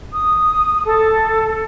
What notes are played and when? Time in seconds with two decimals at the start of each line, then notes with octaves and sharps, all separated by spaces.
0.12 D#6
0.85 A4